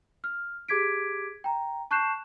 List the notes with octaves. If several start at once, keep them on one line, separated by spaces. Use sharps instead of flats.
F6
G4 G#4 D6 G#6 B6 D7
G5 A#5
A5 C#6 F#6 G6 C7 E7